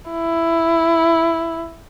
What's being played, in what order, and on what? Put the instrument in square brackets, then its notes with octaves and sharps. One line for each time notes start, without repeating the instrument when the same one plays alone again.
[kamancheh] E4